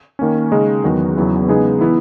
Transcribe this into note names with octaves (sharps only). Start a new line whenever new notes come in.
D#3 A#3 C#4
C#3 G#3 D#4
E2 D#3 F#3 B3 F#4
E2 C#3 F#3 B3 E4
C#3 G#3 B3 D#4 G#4
E3 B3 E4